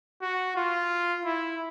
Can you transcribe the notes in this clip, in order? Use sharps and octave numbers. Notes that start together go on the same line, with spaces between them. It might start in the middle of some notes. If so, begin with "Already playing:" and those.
F#4
F4
E4